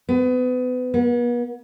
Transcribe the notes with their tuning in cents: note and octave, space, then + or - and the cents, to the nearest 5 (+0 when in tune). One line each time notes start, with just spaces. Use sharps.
B3 +30
B3 -40